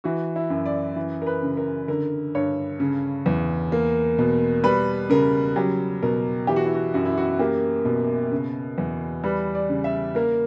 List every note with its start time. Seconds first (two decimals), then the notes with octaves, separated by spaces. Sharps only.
0.04 E3 F#4
0.36 E4
0.50 F#2
0.66 D5
0.96 E3
1.22 A#4
1.26 B4
1.43 C#3
1.57 A#4
1.88 D3 A#4
2.35 G2 C#5
2.80 C#3
3.26 E2
3.72 A#3
4.18 B2
4.64 G3 B4
5.10 C#3 A#4
5.56 F#3 G4
6.02 B2 A#4
6.47 E3 G4
6.56 F#4
6.66 E4
6.75 F#4
6.94 F#2 F#4
7.05 E4
7.17 F#4
7.39 A#3 G4
7.85 B2
8.32 C#3
8.78 E2
9.24 G3 B4
9.55 D5
9.69 C#3
9.84 E5
10.15 A#3 A#4